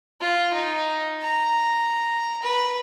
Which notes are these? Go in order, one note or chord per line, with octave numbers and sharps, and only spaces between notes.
F4
D#4
A#5
B4